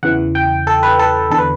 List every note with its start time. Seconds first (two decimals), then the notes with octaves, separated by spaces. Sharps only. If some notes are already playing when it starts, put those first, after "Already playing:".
0.03 E2 C#3 E3 F#5
0.35 G5
0.67 A4
0.83 B4
0.99 A4
1.30 E2 D3 A4
1.38 B4